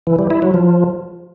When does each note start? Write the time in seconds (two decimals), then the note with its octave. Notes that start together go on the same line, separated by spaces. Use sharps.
0.07 E3
0.19 G3
0.30 E4
0.42 F#3
0.54 F3